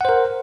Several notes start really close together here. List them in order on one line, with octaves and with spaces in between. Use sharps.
F#5 C5 A#4